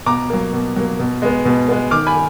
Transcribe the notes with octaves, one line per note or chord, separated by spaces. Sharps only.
B2 A#5 D6
F#3 A#3
B2
F#3 A#3
B2
G#3 B3
B2
G#3 B3
D#3 D6 F6
G#5 B5